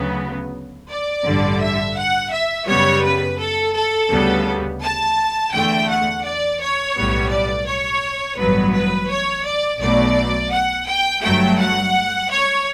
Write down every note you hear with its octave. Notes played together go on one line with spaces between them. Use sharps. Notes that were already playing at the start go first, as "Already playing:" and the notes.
Already playing: D2 C#3 F#3 B3
D5
A1 G2 D3 G3
E5
F#5
E5
F#2 C#3 G3 B3 C#5
B4
A4
A4
D2 C#3 G3 B3
A5
E2 D3 A3 G5
F#5
D5
C#5
B1 A2 G3 B3
D5
C#5
A1 G2 F#3 B3 B4
B4
C#5
D5
B1 B2 F#3 A3 D5
F#5
G5
G1 G2 F#3 A3 G5
F#5
C#5